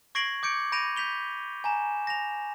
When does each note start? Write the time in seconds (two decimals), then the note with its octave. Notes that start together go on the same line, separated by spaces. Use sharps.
0.15 C#6 G#6 A#6 C7 D7 F#7
0.43 D6 G6 C#7 D7
0.72 B5 G6 A#6 D7 D#7 F7
0.97 G6 B6 F7 G7
1.64 G#5 A#5 E7
2.07 A#6 F7